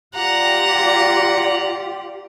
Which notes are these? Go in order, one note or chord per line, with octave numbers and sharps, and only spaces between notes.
F4 G4 D5 F#5 A#5